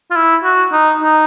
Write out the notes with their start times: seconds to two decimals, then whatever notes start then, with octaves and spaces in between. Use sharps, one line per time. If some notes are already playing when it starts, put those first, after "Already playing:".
0.11 F4
0.16 E4
0.44 F#4
0.72 D#4
1.00 D#4